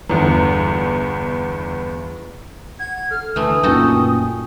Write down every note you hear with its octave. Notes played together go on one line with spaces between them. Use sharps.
G1 E2
F#5 G#6
A4 F6
D2 E3 A3 D#6
F#2 A#2 D#4 F#4 A4 G5 G#5